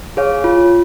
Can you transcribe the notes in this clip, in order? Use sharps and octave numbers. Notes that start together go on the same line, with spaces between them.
G#4 C#5 F5
F4